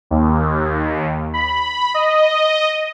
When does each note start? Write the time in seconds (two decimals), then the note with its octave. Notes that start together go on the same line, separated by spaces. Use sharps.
0.11 D#2
1.34 B5
1.94 D#5